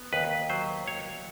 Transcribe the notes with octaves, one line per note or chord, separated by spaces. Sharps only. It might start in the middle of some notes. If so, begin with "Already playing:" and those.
Already playing: B3
D#2 B4
F#3 C5
D#2 C#5